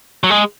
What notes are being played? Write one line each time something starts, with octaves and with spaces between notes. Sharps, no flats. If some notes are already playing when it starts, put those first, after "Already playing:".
F#3
G#3